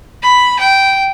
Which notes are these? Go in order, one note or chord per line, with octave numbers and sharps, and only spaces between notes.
B5
G5